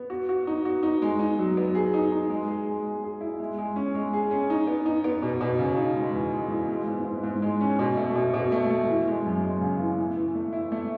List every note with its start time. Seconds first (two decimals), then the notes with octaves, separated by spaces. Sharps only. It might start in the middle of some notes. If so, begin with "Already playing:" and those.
Already playing: B3
0.10 F#4
0.29 F#4
0.47 D#4
0.65 F#4
0.83 D#4
1.02 G#3
1.19 D#4
1.39 F#3
1.57 B3
1.75 G#4
1.94 D#4
2.12 D#4
2.30 G#3
2.48 G#4
2.67 G#3
2.84 G#3
3.04 G#4
3.21 E4
3.39 G#3
3.58 G#3
3.76 C#4
3.95 G#3
4.13 G#4
4.31 C#4
4.50 D#4
4.67 B3
4.86 D#4
5.04 B3
5.22 B2
5.41 B2
5.59 C#3
5.77 D#4
5.96 G#3
6.15 E2
6.33 G#3
6.50 E2
6.69 G#3
6.88 G#2
7.05 G#2
7.23 G#2
7.42 G#3
7.61 C#4
7.79 B2
7.97 A3
8.16 B2
8.34 B2
8.52 A3
8.70 A3
8.89 E3
9.07 G#3
9.25 F#2
9.43 G#3
9.61 C#3
9.80 E3
9.98 A2
10.17 E3
10.35 A3
10.53 E4
10.72 A3